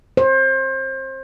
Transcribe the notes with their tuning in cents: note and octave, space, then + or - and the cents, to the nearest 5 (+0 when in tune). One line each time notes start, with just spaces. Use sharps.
C5 +30